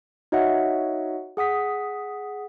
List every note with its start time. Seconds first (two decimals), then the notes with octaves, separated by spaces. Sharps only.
0.32 D#4 F#4 C#5 D#5 E5 F#5
1.37 G#4 F#5 D#6 B6